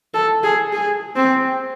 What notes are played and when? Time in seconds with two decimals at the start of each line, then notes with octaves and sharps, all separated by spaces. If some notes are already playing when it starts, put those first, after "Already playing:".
0.14 A4
0.43 G#4
0.73 G#4
1.16 C4